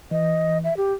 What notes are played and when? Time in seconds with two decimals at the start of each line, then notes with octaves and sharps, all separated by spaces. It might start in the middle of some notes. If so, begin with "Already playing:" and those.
0.11 E3 D#5
0.64 E5
0.77 G4